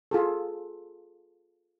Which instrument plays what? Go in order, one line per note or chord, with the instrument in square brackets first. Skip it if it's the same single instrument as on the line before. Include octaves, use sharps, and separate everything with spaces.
[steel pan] F4 G#4 A4